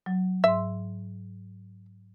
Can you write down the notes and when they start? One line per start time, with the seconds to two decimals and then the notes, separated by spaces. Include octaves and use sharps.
0.06 F#3
0.44 G#2 E5 C6